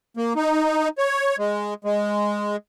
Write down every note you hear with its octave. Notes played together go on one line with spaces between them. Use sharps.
A#3
D#4
C#5
G#3
G#3